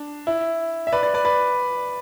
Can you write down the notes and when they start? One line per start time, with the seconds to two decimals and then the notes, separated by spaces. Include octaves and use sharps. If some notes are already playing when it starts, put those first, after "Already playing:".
Already playing: D4
0.27 E4
0.87 E5
0.92 B4 D5
1.03 B4 D5
1.14 B4 D5
1.25 B4 D5